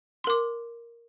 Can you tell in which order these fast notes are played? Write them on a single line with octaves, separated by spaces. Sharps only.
C6 A#4 D6